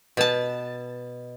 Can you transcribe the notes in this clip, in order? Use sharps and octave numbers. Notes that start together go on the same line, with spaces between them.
B2 A5